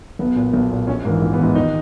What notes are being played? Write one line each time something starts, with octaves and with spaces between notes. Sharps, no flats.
B1 B3
A#2
B1
A#2
A#1 C#4
G#2 E3 A#3
A#1 A#3
B3
G#2 E3 D#4
D#2 D#4